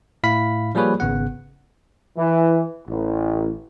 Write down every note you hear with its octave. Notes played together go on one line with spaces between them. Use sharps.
A2 E4 F5 B5 B6
F3 G3 A#3 G#4 B4 C#5
G#1 C#3 B3 F#5
E3
A1